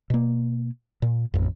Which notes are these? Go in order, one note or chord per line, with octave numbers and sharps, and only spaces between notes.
B2 A#3
A#2
A1 F2